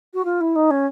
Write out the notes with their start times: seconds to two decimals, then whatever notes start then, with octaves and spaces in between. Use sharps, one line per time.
0.14 F#4
0.24 F4
0.40 E4
0.55 D#4
0.70 C#4